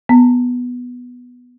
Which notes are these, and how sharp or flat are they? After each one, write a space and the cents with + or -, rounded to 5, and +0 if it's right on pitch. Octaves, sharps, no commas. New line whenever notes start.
B3 +0 A#5 -35